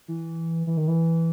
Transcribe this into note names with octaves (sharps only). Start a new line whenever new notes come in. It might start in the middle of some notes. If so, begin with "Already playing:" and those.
E3
E3
D#3
E3